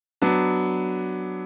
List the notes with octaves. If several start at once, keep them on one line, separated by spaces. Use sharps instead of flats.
F#3 B3 D4